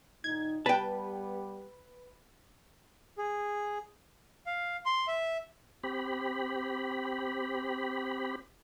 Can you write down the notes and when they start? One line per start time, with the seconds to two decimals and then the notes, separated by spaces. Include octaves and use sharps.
0.24 A#2 D#3 D#4 G#6
0.66 G3 B3 G4 B4 G5 A5
3.18 G#4
4.46 F5
4.86 C6
5.08 E5
5.84 C4 G4 B5